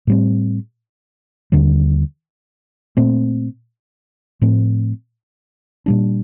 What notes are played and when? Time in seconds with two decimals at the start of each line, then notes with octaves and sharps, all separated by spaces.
0.07 A2 G3 C4
1.52 D#2 D3 G3
2.97 A#2 A3 C4
4.42 A2 F3 A3 C4
5.86 A#2 G3 D4